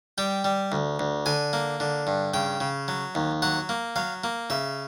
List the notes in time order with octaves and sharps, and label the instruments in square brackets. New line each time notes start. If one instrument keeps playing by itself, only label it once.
[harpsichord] G3 G5
G3
D2
D2
D3 G#5
A#3
D3
G2
C#3 G5
C#3
F#3
D#2
F#3 F#5
A#3
F#3 F5
A#3
C#3 E5